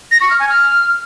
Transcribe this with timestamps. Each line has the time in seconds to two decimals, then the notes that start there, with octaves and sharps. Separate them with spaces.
0.12 A#6
0.21 C#6
0.30 F6
0.40 G#5
0.49 F6